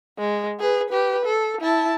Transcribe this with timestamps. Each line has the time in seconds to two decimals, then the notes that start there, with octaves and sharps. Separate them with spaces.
0.19 G#3
0.60 G#4 B4
0.89 G4 B4
1.25 A4
1.61 E4 A5